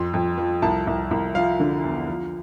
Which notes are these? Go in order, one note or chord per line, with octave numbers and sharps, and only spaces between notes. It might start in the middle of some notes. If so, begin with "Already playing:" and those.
Already playing: F2 C6
F2
F3
C2 A5
C2
C2
F3 F5
D3
E2
F3